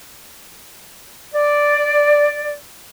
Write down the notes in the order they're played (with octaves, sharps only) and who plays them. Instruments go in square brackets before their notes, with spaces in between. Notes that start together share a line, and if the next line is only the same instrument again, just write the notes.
[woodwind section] D5